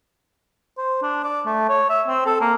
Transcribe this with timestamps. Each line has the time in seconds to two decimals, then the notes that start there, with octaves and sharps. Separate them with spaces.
0.78 C5
1.02 D4
1.24 D5
1.46 A3
1.69 C#5
1.90 E5
2.07 C4
2.26 A4
2.41 A#3